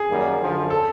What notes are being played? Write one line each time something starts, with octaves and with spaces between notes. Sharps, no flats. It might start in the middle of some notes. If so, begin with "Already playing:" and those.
Already playing: G#4
F#2 D#3 G3 A#3
F#2 D3 F3
A4